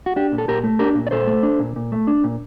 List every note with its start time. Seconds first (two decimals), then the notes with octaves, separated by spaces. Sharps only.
0.06 F#4
0.16 D4 G4
0.32 A#2
0.38 A4
0.48 A#2 G4 A#4
0.63 A3
0.79 D4 G4 A#4
0.95 A#2
1.07 D5
1.11 A#2 A4 C5
1.27 A3
1.43 D4
1.59 A#2
1.76 A#2
1.92 A3
2.07 D4
2.24 A#2